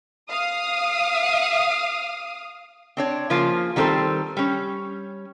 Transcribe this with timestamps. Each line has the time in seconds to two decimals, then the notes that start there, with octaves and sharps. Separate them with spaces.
0.29 F5 D#6
2.97 C4 D4 C#5
3.30 C#3 F3 A#3 F4
3.76 D#3 G3 C4 D#4 A4 C5
4.37 G3 C#4